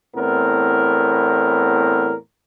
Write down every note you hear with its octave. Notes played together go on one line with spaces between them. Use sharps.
E2 A2 B3 C4 A#4